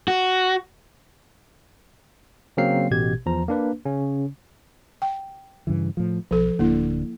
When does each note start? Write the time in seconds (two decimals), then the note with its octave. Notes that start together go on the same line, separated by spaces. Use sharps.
0.08 F#4
2.57 C#3 F#3 A#3 C4 F5 C7
2.90 A1 B2 G4 G#6
3.26 E2 F3 A#5
3.48 A#3 D4 B4
3.85 C#3 C#4
5.02 G5
5.67 G2 C#3 E3
5.97 A2 F3
6.31 B1 F3 A4
6.59 D1 D3 A#3 E4